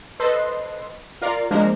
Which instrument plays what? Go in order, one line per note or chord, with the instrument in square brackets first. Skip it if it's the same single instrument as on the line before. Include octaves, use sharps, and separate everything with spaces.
[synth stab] A4 B4 C5 D#5 C6
F4 A#4 D5 F5
F3 G#3 A#3 D4 A#4 C5